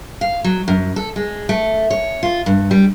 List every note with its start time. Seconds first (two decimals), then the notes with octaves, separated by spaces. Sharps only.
0.21 F5
0.44 F#3
0.68 F#2
0.96 A4
1.16 G#3
1.49 A3
1.90 C#5
2.23 F4
2.46 G2
2.71 G3